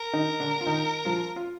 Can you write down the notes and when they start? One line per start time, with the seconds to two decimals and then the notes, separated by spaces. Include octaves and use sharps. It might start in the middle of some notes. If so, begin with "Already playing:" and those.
Already playing: A#4
0.13 D#3 D#4
0.40 D3 D4
0.61 F4
0.66 D#3 D#4
1.05 F3 F4
1.36 F4